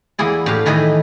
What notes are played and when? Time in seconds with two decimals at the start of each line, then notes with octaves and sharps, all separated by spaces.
0.19 E2 A#3 E4 G#4 D5
0.46 A2 G4 B4 F5
0.66 A2 D#3 E3 G#4 B4 D#5